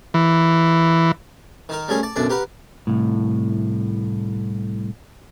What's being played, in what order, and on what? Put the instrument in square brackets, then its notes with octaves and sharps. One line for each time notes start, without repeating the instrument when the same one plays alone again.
[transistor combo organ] E3
[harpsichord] D#3 D#4 A#4
G3 A3 C#4 G#4 A#4
D5 A5
B1 F#2 D3 D4 D5
G4 A#4 B4 F#5
[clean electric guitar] C2 A2